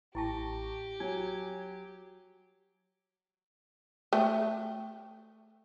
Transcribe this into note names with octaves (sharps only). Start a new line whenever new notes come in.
A1 E4 G4 G5 A5 C#6 A#6
F#3 G#5 G#6
A3 G5